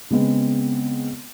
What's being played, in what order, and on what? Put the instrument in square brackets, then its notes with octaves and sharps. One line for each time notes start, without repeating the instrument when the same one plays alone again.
[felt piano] C#3 G#3 B3 C4